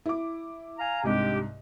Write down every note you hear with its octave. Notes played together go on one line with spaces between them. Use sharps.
E4 D6
F5 G#5 A#5
C2 G#2 G#3 D4 G4